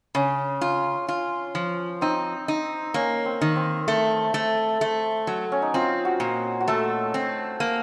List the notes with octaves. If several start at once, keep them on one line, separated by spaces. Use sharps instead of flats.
C#3 C#4
F4
F4
F3
C4 D#4
D#4
A#3 C#4
C4
D#3
C4
A3
A3
A3
F#3
C#4
D#4
C4 F4
F#4
A#2
F#4
A3 A4
C4
A#3